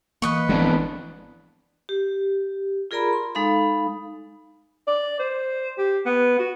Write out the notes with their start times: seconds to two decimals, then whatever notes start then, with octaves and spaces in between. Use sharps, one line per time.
0.22 E3 A#3 B4 D#5 C#6
0.49 G1 E3 F3 G#3 A3 B3 C4 D4
1.89 G4
2.91 F4 G#4 A#4 D5 A#5 B5
3.13 C6
3.35 G#3 D#4 A4 F5 B5
4.88 D5
5.19 C5
5.78 G4
6.06 B3
6.39 F#4